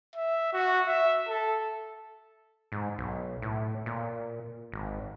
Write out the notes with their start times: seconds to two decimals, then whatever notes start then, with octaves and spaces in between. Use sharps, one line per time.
0.16 E5
0.53 F#4
0.86 E5
1.28 A4
2.72 G#2
2.98 B1
3.42 A2
3.86 A#2
4.72 G#1